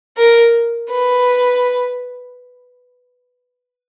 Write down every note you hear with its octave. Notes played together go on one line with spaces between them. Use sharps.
A#4
B4